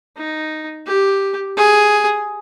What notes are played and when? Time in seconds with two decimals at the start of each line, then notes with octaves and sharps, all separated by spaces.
0.17 D#4
0.87 G4
1.57 G#4